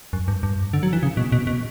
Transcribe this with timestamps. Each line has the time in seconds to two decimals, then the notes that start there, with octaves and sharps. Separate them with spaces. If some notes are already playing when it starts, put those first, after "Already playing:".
0.13 F#2
0.28 G2
0.43 G2
0.73 D3
0.83 F#3
0.93 E3
1.03 C#3
1.17 B2
1.32 B2
1.47 B2